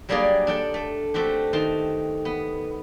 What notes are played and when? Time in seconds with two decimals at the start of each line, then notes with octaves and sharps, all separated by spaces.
0.09 F#3 G3 A#3 D4 G#4 D5
0.47 D4 A4 G5
0.74 A3
1.14 A3 C4 F#4 G4
1.53 D#3 A5 C6
2.25 B3